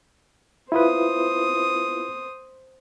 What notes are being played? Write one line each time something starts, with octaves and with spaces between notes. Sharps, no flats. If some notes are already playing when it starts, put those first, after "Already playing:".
E4 F4 B4 C5 D#6